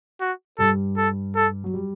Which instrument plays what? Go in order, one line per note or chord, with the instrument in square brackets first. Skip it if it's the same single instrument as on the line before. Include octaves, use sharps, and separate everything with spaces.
[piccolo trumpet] F#4
[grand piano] G2 G3 [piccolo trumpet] A4
[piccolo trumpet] A4
A4
[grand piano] F#3
G3